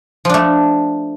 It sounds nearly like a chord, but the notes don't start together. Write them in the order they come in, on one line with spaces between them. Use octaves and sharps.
F3 D4 A3